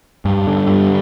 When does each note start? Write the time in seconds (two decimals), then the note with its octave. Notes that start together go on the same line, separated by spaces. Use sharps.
0.25 G2
0.47 D3
0.69 G2